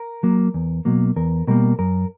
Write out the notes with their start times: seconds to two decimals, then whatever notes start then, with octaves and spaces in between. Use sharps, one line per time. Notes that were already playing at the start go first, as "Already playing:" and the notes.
Already playing: A#4
0.23 F#3 A#3
0.54 E2
0.85 B2 F#3 A#3
1.16 E2 A#4
1.47 B2 G3 A#3 A#4
1.79 F#2 A#4